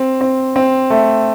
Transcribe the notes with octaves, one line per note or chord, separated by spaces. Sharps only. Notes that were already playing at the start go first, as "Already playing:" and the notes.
Already playing: C4
C4
C4
A3